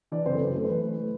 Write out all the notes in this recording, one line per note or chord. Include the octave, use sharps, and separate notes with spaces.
E3 D4 D5
F#1 C4 C5
A4
F#2 B4
A3 A4
C5
E3 B4
A3
A3